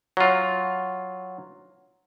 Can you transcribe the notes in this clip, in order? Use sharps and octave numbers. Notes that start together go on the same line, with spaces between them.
F#3 F4